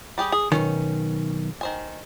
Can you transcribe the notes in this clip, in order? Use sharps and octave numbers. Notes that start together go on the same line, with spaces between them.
G3 G4 G#4
G#4
B1 F2 D#3 C#4
D#3 C5 G#5